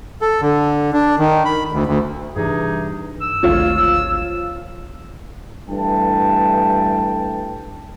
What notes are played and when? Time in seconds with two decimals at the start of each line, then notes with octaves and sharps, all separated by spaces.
0.22 A4
0.42 D3
0.93 D4
1.19 D#3
1.45 B5
1.72 D2
1.86 D2
2.36 G2 C3 E3 D#4 G#4
3.21 E6
3.43 G#1 D2 F3 F4 C#5
5.68 G2 E3 A3 G5 A5